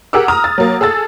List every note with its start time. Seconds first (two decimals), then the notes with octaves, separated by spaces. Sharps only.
0.13 G4 G#4 A#4 F#5 D6 E6
0.28 A#5 D#6 F6
0.44 A6
0.58 F#3 A#3
0.81 G#4 A4 E6 A6